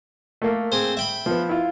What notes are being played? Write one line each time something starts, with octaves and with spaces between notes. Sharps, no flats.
A3 A#3
C4 G#4 C5
E5 G5 B5
F3 B3
E4 F4